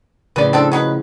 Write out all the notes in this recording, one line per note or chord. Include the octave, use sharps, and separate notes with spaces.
A2 C#3 F3 B4 D5
C4 D4 A4
B2 F#3 B4